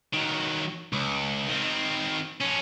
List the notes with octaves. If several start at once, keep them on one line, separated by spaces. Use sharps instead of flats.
D#3 F#3
C#2
D#3 C4
F3 C#4